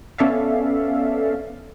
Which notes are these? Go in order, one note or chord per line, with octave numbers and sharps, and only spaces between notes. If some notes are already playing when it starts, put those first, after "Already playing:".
B3 C#4 A4 D5 E5 F5